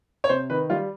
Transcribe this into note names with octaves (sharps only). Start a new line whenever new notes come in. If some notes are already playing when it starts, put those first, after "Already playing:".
C#5
C3 C5
D#3 B4
G3 F4